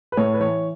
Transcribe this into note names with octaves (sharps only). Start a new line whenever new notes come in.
B4
A2 C#5
B4
E3 C#5